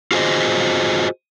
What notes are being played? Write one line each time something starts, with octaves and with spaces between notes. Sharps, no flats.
F4 F#4 G#4 B4 C5 D#5